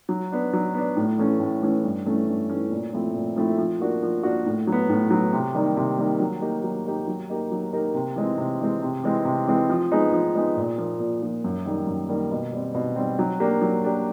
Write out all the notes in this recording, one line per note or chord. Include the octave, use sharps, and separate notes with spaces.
F#3
B3 D4
F#3
B3 D4
A2
E3 A3 C#4
A2
E3 A3 C#4
G2
E3 A3 C#4
G2
E3 A3 C#4
A#2
F3 A3 C4 E4
A#2
F3 A3 C4 E4
F3
A#3 D4 F#4 A#4
F3
A#3 D4 F#4 A#4
A2
F#3
B3
A2
F#3 B3
C3
D#3 G3 A#3
C3
D#3 G3 A#3
F#3
A#3 D#4 G4
F#3
A#3 D#4 G4
F#3
A#3 D#4 G4 A#4
F#3
A#3 D#4 G4 A#4
C3
E3 G#3 C4
C3
E3 G#3 C4
C3
E3 G#3 C4
C3
E3 G#3 C4
F3
G#3 B3 D#4 G#4
F3
G#3 B3 D#4 G#4
A#2
F3 A#3
A#2
F3 A#3
F#2
D#3 G3 A#3
F#2
D#3 G3 A#3
B2
G3 C4
B2
G3 C4
F#3
A#3 D4 G4
F#3
A#3 D4 G4